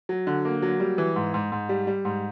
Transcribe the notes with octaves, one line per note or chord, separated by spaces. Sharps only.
F#3
D3
A#3
F#3
G3
E3
G#2
G#2
G#2
G3
G3
G#2